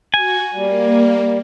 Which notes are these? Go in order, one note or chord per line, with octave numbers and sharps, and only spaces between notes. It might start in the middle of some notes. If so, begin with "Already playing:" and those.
F#4 G#5
G3 A#3